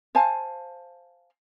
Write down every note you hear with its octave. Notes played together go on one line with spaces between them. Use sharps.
C5 F5 G#5 A5